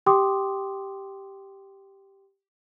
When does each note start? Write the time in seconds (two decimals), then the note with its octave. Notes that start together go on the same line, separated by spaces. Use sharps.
0.06 G4 G5 C6 D6 D#6